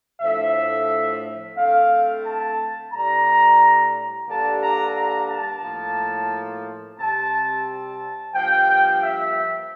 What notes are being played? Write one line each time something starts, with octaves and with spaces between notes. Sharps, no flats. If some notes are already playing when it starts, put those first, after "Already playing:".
A2 F3 A3 D4 E5
D3 A3 C4 F5
A5
A2 G3 D4 A#5
G2 D3 G3 A#3 D4 A5
A#5
A#5
A5
A2 F3 A#3
C3 G3 C4 A5
A5
G2 F3 A#3 G5
E5